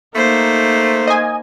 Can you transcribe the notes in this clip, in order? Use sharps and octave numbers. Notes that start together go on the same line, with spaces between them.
A3 A#3 D#4 C5
D#5 G#5